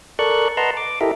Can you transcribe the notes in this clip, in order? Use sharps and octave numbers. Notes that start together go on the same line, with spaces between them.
A4 A#4 D5 C#6 F#6
B4 D#5 F#5 A5 A#5 C6
D6
E4 G4 A4 A#4 D#5 E5